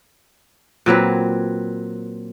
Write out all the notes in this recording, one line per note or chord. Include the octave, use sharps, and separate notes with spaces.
A#2 F#3 C4 B4